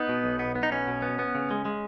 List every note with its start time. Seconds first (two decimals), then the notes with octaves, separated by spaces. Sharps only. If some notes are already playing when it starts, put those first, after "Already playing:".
Already playing: B3 D#4
0.09 B2
0.24 B1
0.39 B3
0.55 B3
0.63 D#4
0.71 B1 C#4
0.87 B2
1.02 B3
1.19 B3
1.35 C#3
1.51 G#3
1.65 G#3